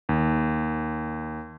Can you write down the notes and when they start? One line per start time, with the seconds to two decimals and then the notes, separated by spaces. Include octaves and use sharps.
0.09 D#2